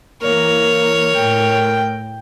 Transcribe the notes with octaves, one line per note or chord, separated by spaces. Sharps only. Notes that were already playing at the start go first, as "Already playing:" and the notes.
E3 A#3 A#4 C#5
A2 G5